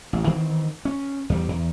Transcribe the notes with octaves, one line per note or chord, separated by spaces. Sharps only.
A1
D#3 E3 C4
C#4
E2 G3
E2